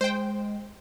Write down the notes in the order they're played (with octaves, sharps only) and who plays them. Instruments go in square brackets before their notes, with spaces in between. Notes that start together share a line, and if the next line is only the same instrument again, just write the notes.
[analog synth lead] G#3 [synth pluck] C5 G5